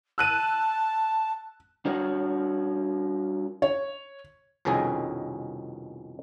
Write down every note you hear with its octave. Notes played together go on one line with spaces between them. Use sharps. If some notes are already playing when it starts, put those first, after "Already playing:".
A5 E6 F#6 D#7
G3 D4 F#4 A#4 C#5 F#5
C#5
C2 F2 B2 D#3 C#4 G#4